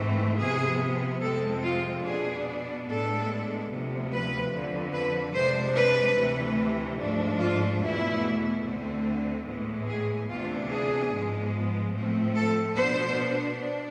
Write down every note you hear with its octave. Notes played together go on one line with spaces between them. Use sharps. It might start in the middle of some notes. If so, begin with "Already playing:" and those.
Already playing: G#2 E3 A3 C4
C3 F3 B3 G#4
F2 C3 G#3 C4 A4
F4
B2 B3 D4 G#4
A2 G#3 B3 D4 A4
D2 C3 F3 B3
B4
F2 D3 F3
B4
C3 G#3 D4 C5
B4
D2 C3 E3 A3
G#2 F3 A3 D4
F4
E2 B2 A3 E4
D2 D3 A3 C4
A2 E3 G#3 B3
G#4
D2 C3 E3 B3 D4 F4
G#4
G#2 F3 G#3 B3
A2 F3 A3 C4
A4
B2 B3 D4 C5
D4